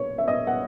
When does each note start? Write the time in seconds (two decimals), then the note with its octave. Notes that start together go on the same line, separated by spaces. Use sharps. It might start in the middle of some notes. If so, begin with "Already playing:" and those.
Already playing: C#5
0.18 E5
0.28 D#5
0.47 F#5